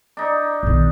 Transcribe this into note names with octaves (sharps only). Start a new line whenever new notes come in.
D4 D#4
B1 D#3